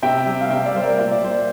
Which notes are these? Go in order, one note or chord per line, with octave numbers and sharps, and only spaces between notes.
C3 E5 G5
G3
F5
C3 E5 G5
D5 F5
G3 C5
A#4 D5
A#2 E5
D5
G3 C5